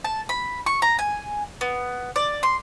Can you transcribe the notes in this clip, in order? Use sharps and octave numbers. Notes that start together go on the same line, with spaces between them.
A5
B5
C#6
A#5
G#5
B3
D5
C6